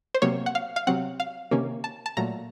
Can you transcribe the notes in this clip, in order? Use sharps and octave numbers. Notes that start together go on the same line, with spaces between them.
C5
C3 F#3 A#3 C#5
F#5
F5
F5
C3 F#3 C4 F#5
F5
C3 D#3 A#3 C#4
A5
A5
A#2 F#3 A3 A#5